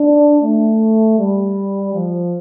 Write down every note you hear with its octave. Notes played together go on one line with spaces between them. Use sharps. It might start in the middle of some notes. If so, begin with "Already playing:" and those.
Already playing: D4
A3
G3
F3